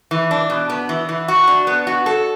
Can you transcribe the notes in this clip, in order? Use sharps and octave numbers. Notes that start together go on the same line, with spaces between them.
E3
D4
B2
B3
E3
E3
F#4
D4
B3
F#4
A4